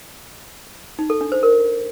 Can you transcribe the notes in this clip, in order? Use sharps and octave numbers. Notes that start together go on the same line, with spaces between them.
D#4
A4
D4
C5
A#4